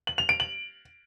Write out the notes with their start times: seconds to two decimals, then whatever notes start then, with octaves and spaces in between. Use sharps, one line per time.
0.07 F#7
0.18 F7
0.29 D7
0.40 F#7